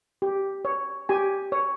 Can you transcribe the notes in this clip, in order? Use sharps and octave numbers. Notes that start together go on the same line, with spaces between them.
G4
C#5
G4 G#5
C#5